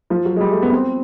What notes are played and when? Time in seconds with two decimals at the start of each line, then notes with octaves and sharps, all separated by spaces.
0.10 F3
0.25 F#3
0.36 G#3
0.41 G3
0.52 A3
0.62 B3
0.72 C4